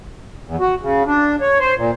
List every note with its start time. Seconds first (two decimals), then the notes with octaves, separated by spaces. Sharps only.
0.45 E2
0.60 F#4
0.81 C#3
1.06 D4
1.41 C#5
1.60 C5
1.76 A#2